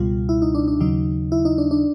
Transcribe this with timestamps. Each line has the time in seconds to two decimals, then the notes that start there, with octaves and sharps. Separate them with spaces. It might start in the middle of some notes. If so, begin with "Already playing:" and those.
Already playing: C#2 B2 G3 F4
0.29 E4
0.42 D#4
0.55 D4
0.68 D4
0.80 D#2 C#3 F#3 D#4
1.32 E4
1.45 D#4
1.58 D4
1.71 D4